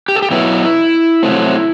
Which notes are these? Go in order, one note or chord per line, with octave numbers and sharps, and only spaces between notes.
G4
A4
G4
B2 F#3 B3 E4
C3 F#3 A3 C4